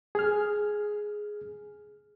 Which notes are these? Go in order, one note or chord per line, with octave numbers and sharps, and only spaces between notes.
G#4 F6